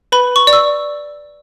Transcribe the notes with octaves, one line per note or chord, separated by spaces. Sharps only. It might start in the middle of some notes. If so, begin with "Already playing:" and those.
B4 B5
C#6
D5
E6